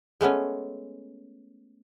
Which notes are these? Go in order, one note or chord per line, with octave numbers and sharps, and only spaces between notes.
G#3 A3 B3 C#4